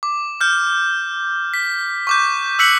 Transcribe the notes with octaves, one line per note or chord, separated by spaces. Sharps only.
D6
F6 G6
B6
C#6 D6 G6
E6 F#6 B6 C#7 F#7